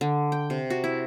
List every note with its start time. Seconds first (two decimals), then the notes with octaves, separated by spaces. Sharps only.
0.01 D3
0.32 G5
0.50 C3
0.70 F#4
0.84 E4